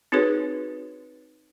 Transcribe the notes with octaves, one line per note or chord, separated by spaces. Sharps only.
C4 D#4 F#4 G#4 B4 C#5